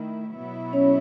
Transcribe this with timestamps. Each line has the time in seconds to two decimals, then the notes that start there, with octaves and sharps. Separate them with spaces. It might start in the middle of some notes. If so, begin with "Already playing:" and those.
Already playing: D#3 A3 E4
0.35 B2 F#3 B3 E4
0.73 C#4 C#5